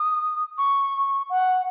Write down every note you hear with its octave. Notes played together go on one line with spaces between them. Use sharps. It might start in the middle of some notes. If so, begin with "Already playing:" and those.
Already playing: D#6
C#6
F#5